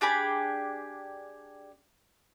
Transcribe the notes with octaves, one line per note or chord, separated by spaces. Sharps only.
D4 G4 G#4 B5